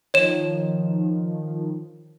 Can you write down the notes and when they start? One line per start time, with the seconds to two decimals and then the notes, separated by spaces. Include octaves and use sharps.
0.14 D#3 F3 C#5 E7